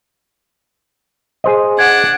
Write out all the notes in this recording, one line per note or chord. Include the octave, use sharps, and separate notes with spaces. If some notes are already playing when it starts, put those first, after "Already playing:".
G#4 C5 D#5
D4 F#5 G#6